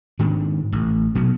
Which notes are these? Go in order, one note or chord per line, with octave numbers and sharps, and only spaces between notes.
G#2 D#3 D4
A1
B2 F#3